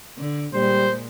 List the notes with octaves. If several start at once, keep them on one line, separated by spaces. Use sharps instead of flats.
D3
A#2 G3 G#3 C5